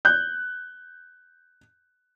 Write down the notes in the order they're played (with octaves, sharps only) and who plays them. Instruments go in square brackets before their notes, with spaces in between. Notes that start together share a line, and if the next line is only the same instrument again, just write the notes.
[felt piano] F#6 G6